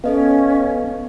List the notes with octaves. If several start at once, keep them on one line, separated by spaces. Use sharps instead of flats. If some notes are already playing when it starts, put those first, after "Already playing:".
B3 C#4 A4 D#5 F5